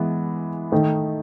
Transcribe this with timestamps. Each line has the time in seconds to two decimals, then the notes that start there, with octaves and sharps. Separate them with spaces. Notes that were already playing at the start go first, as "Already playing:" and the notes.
Already playing: E3 G#3 B3
0.72 D#3 A3 D#4